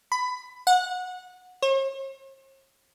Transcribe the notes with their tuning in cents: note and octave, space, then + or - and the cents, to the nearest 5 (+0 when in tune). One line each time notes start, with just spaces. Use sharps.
B5 +20
F#5 -20
C#5 -45